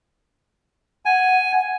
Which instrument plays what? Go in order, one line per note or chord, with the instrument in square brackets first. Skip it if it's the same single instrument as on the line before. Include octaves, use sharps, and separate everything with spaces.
[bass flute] F#5 [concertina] G#5